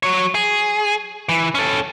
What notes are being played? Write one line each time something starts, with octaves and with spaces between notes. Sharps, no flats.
F#3 C#5
G#4
E3
C#4 A4